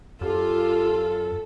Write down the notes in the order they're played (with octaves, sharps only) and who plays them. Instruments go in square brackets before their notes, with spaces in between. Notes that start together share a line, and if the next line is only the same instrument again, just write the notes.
[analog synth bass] F#2 [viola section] F4 [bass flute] G4 [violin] A4